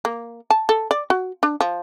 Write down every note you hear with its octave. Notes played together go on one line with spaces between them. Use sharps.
A#3
A5
A4
D5
F#4
D4
F3